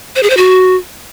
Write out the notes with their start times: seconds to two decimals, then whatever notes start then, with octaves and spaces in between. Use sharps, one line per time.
0.16 C5
0.23 G#4
0.30 C5
0.37 F#4